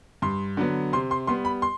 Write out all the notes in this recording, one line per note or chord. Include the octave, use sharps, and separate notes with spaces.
G2 C6
D3 F#3 B3
C3 C6
C6
G3 B3 C6
B5
C6